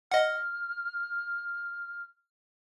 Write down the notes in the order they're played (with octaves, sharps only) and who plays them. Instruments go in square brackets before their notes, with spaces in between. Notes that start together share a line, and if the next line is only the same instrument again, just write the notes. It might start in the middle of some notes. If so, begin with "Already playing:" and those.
[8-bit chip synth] D#5 F#5 [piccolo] F6